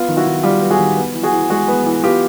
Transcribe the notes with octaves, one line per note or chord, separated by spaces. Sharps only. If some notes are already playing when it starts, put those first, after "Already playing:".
Already playing: B3 F4
D#3
E4 F#4
D#3
G3 F4 G4
B3
F#4 G#4
D#3
B3
E3
F#4 G#4
E3
G#3 F#4 G#4
B3
E3
B3 F4 G4